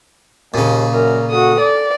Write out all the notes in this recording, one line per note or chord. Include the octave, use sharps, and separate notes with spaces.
D#2 A#2 C#3
F#2 A#4
F#4 A4 D#6
D5